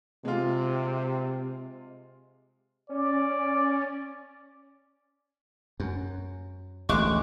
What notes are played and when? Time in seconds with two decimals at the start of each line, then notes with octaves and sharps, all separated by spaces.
0.25 C3 G#3 F4
2.89 C#4 D5
5.80 F#2
6.89 A1 D2 G#3 C#6 D6 F#6